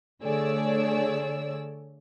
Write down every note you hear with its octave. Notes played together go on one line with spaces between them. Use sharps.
D3 A3 G#4 C#5 D5 E6